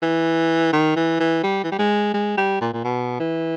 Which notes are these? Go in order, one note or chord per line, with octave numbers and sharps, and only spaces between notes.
E3
D#3
E3
E3
G3
E3
G3
G#3
G#3
G3
A#2
A#2
B2
E3